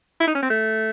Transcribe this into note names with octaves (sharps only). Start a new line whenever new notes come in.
E4
D#4
C#4
C4
A3